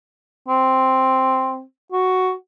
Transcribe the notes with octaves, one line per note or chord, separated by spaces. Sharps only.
C4
F#4